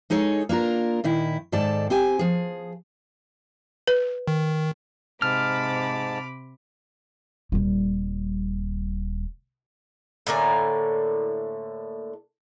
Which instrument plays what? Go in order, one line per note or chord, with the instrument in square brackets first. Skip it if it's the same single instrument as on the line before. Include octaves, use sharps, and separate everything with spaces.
[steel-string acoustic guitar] G#3 D#4 G#4 A4 C#5
A#3 D4 F4 A#4
A#2 D#3 E4
G#2 D#3 A4 D5 A5
C4 G4 G#5
F3 G#4
[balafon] B4
[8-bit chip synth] D#3
[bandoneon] G#2 A5 [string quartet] C3 B5 D6 [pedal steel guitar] F6
[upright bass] D#1 G3
[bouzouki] A2 D3 A#3 G#5